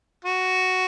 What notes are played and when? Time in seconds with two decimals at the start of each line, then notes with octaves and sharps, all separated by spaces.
0.25 F#4